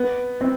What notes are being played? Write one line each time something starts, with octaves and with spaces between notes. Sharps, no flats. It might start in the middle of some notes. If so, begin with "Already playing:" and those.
Already playing: B3
C4